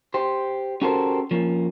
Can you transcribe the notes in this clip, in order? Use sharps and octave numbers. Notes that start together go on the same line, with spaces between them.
G4 C5
C#4 F#4 G4 A4 A#4 C5
F3 A#3 C#4